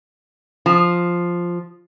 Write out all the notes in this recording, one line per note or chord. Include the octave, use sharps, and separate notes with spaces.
F3